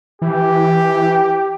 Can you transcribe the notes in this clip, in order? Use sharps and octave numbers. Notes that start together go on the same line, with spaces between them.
E3 G4